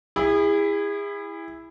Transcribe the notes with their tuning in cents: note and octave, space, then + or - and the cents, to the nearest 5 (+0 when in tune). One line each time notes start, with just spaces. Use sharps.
E4 +0 G#4 -35